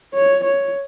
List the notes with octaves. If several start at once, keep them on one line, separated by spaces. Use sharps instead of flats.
C#5
C#5